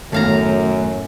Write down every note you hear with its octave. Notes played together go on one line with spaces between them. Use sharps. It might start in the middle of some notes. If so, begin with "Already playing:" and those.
F#2 A2 D#3 A3 B3 F5 A#5